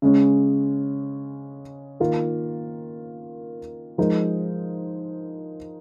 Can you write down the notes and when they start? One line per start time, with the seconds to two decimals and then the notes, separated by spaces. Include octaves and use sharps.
0.02 C#3 G#3 C#4
2.00 D#3 A#3 F4 A#4
3.98 F3 G#3 D#4 A#4